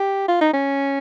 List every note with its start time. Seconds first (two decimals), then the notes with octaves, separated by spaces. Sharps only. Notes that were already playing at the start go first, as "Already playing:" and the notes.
Already playing: G4
0.28 F4
0.41 D#4
0.53 C#4